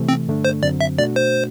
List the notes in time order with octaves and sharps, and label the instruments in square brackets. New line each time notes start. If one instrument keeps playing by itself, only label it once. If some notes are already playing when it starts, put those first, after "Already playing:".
Already playing: [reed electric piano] C3 E3 A3
[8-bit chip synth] C4
[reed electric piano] G2 D3 A3 D4
[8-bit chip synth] C5
[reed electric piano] F#2 D3 F#3 C4 [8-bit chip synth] D5
[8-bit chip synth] E5
[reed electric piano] B2 A3 D4 F#4 [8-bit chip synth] D5
[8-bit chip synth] C5